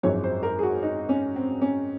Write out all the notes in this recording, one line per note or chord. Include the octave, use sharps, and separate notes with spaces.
G#1 F#2 F3 G#3 C#5
C5
A#4
G#4
F#4
D#4
C#4
C4
C#4